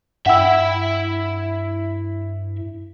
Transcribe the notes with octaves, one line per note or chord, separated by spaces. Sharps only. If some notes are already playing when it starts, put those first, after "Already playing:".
G2 E4 E5 F#5 G5 E6